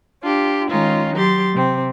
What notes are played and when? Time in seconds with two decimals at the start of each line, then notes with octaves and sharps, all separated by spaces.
0.22 D4 F4 G4
0.69 D#3 G#3 C#4 D#4 F4
1.14 F#3 G4 C6 A6
1.53 C3 C4